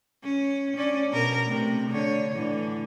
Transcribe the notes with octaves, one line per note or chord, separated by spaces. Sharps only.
C#4
C#4 D4 D5
B2 A#4
C3 A3
D3 C#5
A2 D3 E3